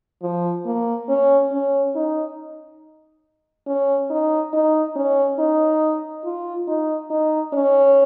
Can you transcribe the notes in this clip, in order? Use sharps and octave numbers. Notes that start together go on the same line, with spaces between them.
F3
A#3
C#4
C#4
D#4
C#4
D#4
D#4
C#4
D#4
F4
D#4
D#4
C#4